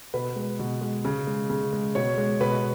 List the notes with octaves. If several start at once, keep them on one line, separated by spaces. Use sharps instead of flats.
B2 B4
G#3
B2
G#3
C#3
G#3
C#3
G#3
B2 C#5
G#3
B2 B4